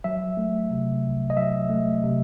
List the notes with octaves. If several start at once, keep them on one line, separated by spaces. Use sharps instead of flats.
F#3 E5
A3
C3
C2
D#5
F#3 E5
A3
C3